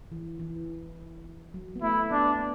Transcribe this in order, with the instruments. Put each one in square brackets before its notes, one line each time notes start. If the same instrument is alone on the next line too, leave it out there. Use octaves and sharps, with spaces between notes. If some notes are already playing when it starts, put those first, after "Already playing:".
[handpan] E3
E3
F#3
B3
[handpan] A3 [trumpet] E4
[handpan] B3 [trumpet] D4
[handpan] B3